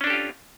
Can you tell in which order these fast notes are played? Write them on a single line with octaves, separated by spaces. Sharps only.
C#4 D4 A4 G4 F4